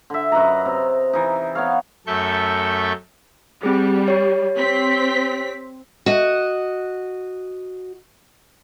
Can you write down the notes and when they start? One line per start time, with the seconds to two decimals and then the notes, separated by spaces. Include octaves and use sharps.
0.10 D3 E5
0.32 F#2 B4 D#5 A#5
0.65 C3
1.13 E3 D#4
1.55 B3 C#5 F5
2.07 F#2 A3 A4 E5 C#6 G6
3.63 G3 C4 G#4
4.08 G4 C#5
4.57 C4 B6
6.06 F#4 D#5